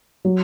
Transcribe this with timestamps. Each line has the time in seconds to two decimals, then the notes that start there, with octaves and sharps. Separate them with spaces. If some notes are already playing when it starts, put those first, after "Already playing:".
0.25 F#3